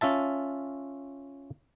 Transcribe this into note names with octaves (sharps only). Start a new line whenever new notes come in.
C#4 F4 E5 A5